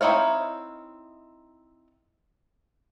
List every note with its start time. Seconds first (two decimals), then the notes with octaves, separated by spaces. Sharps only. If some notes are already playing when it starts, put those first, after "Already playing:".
0.01 C4 D#4 E4 C#5 F5